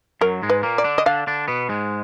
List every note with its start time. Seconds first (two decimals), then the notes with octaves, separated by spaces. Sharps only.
0.21 F#2 F#3 A#4
0.42 G#2 G#3
0.50 B4
0.63 A#2 A#3
0.78 D5
0.84 D3 D4
0.98 D#5
1.06 D3 D4 F5
1.27 D3 D4
1.48 B2 B3
1.69 G#2 G#3